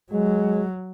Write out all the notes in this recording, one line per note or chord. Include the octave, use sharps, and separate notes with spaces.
F#3 G#3